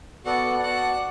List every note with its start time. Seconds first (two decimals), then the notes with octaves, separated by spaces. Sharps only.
0.25 B3 F#4 A4 D5 F#5
0.62 F#4 D5 F#5 A5